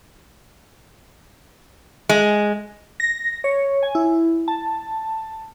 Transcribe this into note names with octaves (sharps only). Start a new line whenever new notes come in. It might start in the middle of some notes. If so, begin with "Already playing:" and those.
G#3
A#6
C#5
G#5
E4
A5